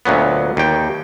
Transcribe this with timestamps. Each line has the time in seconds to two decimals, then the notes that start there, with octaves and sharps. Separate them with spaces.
0.05 D2 A#2 F#3 B3
0.57 D#2 G5